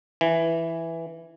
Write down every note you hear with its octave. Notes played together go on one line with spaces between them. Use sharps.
E3